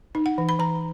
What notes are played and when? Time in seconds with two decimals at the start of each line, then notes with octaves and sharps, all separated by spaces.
0.15 D#4
0.26 F#5
0.38 E3
0.49 B5
0.59 E3 A#5